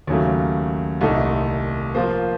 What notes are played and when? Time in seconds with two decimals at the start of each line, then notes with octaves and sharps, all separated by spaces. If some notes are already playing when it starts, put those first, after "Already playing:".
0.07 D#2 C#3 F#3 A3
1.01 C2 A#2 A3 D#4 A4
1.95 F3 A#3 F4 C5